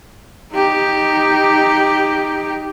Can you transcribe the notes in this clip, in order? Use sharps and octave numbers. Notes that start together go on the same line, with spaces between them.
D#4 G4